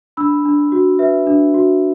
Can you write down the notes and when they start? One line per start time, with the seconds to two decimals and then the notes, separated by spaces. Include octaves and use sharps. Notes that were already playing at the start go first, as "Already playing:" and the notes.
0.17 D4 B5 E6
0.45 D4
0.72 F#4
0.99 B4 E5
1.27 D4
1.54 F#4